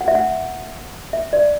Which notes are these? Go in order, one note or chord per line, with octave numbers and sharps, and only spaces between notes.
F#5
E5
F#5
E5
D5